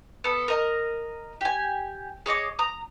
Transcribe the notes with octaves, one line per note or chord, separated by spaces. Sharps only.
B3 A4
A#4 D#5 A#5
G4 G#5
G#4 C#5 D#5 D6
A#5 D#6